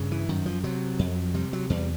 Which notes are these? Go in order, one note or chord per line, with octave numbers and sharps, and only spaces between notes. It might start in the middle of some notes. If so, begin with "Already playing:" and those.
Already playing: G2 C#3
E3
F#2 D#3
F3
C3 F#3
F2
C3 G3
F#3
E2 G3